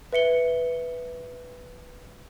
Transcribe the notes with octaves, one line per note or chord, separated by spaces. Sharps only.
B4 E5 C#7 G7